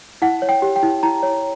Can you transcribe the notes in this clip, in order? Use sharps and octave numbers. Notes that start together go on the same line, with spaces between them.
E4 F#5
C#5
G5
G4
G5
E4
E4 A#5
C#5